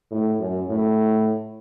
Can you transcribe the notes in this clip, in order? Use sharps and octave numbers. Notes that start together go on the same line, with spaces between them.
A2
F#2
A2